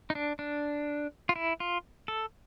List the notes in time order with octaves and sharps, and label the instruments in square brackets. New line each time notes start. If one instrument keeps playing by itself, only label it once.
[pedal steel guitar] D#4
D4
D4
F4
E4
F4
A4